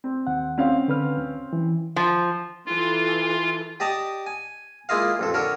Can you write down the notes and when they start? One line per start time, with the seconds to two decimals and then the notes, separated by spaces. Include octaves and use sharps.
0.04 C4
0.27 D#2 F#5
0.58 C4 C#4 F5
0.88 D3 B4 F6
1.18 D2
1.53 E3
1.96 F3
2.66 E3 F4 A4
3.80 G4 D5 D#5 A5 A#5
4.27 G#5
4.89 G#3 A#3 E4 F4 D#5 F5
5.19 A1 F2 A4
5.34 D3 A4 A#4 C#5